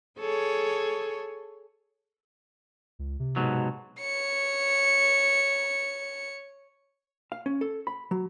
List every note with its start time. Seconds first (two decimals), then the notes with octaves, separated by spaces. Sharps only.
0.19 G#4 A4 C#5
2.99 C#2
3.19 C3
3.36 G#2 B2 F#3
4.00 C#5 C#7
7.32 F5
7.46 C#4
7.61 A4
7.87 B5
8.11 F#3